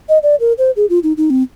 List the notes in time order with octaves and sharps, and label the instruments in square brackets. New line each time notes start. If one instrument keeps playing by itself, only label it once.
[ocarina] D#5
D5
A#4
C5
G#4
F4
D#4
D#4
C4